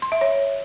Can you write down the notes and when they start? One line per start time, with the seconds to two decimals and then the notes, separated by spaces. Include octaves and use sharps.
0.02 C6
0.12 E5
0.21 C#5